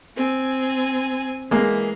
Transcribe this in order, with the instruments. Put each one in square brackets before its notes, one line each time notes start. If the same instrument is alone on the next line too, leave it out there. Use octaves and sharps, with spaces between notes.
[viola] C4 G#5
[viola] E3 [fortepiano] G#3 A#3